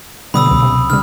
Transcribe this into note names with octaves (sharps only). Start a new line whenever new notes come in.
B2 D3 G3 B5 D#6 E6
C#2 B2 F#3
C3
C#3 G3 F6